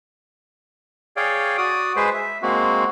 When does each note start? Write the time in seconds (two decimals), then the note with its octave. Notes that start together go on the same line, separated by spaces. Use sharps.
1.17 G#4 C#5 D5 F5 G5
1.58 F#4 D5 D#6
1.96 G#3 G#4 B4 C5
2.14 E5
2.42 G#3 A#3 C4 F#4